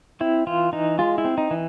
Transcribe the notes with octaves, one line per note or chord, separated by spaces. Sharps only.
C4 E4
E3 F4
E3 D#4
G#3 F4
E4
C4
D#4
E3